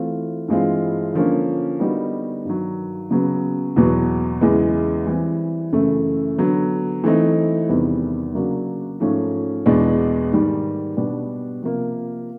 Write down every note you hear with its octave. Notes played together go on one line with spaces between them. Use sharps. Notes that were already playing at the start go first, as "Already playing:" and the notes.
Already playing: E3 A3 C4 F4
G2 E3 G#3 C4 F4
D3 F3 A#3 C#4
D3 G3 B3 D#4 F#4
G2 D#3 F#3
C#3 F#3 B3
E2 B2 F#3 B3
E2 C#3 E3 G#3 B3
E3 G3 C4
F#2 C#3 E3 A3
D3 F#3 B3
E3 A3 C4 D#4
E2 C3 D#3 G3 B3
C#3 F#3 A#3 D4 F#4
G#2 F3 A3 C#4
E2 B2 G#3 B3 D4
G#2 D#3 G3
B2 G3 B3 D4
C3 F3 A#3